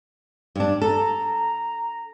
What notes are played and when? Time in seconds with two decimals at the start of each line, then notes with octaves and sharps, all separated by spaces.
0.55 G2 D4
0.82 A4 A#5